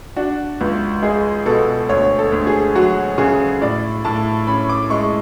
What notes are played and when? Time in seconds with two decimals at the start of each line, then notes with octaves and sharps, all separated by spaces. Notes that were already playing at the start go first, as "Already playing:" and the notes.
0.16 D4 F#4
0.61 C#2
1.03 G#3 G#4
1.46 B2 A4
1.89 D2 C#5
2.19 A4
2.32 D2
2.47 G#4
2.75 F#3 F#4
3.18 C#3 G#4
3.61 A2 D5
4.05 A2 A5
4.47 C#4 B5
4.69 D6
4.90 G#3 C#6